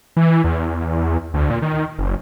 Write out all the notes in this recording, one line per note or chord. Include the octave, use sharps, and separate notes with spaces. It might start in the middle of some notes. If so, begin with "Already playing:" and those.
E3
E2
D2
A#2
D#3
F#1